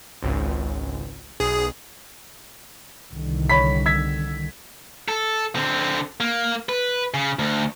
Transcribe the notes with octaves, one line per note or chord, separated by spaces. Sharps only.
G#1 C#2
B1 G#4
C2 D3 D#3
C#5 B5 B6
E6 G#6 B6
A4
D3 C4
A#3
B4
C#3
D2